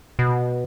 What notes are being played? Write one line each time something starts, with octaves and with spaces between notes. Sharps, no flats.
B2